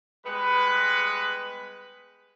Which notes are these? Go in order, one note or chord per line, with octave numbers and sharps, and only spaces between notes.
G3 G#3 B3 B4